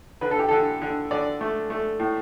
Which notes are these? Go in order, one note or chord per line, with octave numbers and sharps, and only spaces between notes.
D3 B4
A4
G4
D3 A4
D3
D3 D5
A3
A3
A2